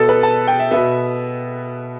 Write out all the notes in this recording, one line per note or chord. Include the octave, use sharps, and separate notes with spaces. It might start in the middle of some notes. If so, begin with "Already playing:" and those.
Already playing: B2 B3 A4
B4
A5
G5
E5
B2 B3 E5